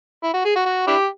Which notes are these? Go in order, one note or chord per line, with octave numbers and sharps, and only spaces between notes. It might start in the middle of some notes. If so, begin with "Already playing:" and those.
E4
F#4
G#4
F#4
F#4
D4 E4 G4